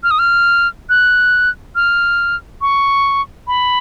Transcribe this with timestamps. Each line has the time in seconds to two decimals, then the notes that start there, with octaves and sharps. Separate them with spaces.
0.03 F6
0.11 D#6
0.19 F6
0.89 F#6
1.76 F6
2.61 C#6
3.47 B5